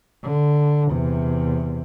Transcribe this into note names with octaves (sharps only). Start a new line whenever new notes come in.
D3
E2 C3